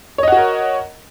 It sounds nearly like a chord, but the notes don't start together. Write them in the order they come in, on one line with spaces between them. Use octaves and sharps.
C#5 D#5 F#5 F#4 A#4